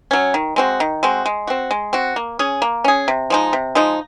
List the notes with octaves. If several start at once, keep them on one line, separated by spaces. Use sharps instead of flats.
F#3 C#4
D#3
G#3 C4 F#4
D#3
G#3 C4 F#4
G#3
C4 F#4
G#3
C4 F#4
A#3
C#4 G#4
A#3
C#4 G#4
C3
F3 G#3 D#4
C3
F3 G#3 D#4